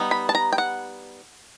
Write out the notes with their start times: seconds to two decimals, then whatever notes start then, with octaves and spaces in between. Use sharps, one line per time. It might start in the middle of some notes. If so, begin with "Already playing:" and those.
Already playing: G3 B3 D#4
0.11 B5
0.29 A5
0.35 A#5
0.52 G5
0.58 F#5